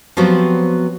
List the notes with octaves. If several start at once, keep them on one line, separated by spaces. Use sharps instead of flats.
F3 F#3 B3 C4 F#4 G4